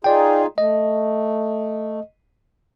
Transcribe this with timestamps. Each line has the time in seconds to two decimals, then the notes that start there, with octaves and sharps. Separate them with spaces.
0.04 D#4 F4 G#4 D5 G5
0.58 A3 D#5